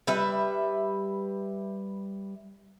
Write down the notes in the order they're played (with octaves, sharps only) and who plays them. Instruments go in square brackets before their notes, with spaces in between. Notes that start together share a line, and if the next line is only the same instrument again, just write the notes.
[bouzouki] G3 B4 E5